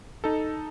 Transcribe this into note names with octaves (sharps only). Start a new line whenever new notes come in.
D#4 A4